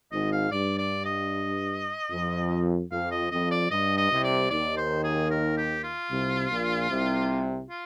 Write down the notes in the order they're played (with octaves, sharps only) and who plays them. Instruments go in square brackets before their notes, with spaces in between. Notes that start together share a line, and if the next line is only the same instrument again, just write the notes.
[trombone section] G#1 G#2 [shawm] D#5
[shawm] F5
[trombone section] G2 [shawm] D5
[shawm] D5
D#5
[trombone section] F2
[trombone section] F2 [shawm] F5
[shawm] D#5
[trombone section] F2 [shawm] D#5
[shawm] D5
[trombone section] G2 [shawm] D#5
[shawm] D#5
[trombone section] C2 C3
[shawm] D5
[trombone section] D#2 D#3 [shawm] D5
[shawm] C5
G#4
A#4
G4
F4
[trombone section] C2 C3
A#1 A#2
C2 C3
[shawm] F4